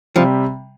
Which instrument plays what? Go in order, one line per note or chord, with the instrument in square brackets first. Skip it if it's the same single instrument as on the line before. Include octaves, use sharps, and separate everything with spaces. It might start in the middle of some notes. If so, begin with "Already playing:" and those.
[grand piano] C3 G3 [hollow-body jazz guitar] F3